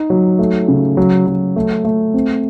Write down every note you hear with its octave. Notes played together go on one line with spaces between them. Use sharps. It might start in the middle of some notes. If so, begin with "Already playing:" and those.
Already playing: D#4
F#3
A3
C#3
F#3
F#3
A3
A3
C4